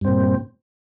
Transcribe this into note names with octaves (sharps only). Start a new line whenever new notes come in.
G2 A#2 C4